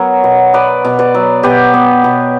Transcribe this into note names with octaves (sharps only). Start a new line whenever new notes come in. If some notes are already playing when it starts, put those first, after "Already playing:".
Already playing: F#3 B3 A#4 C#5
B2
B3 B4 D5
B2
B4 D5
F#3
B2 G4 B4
B3
B2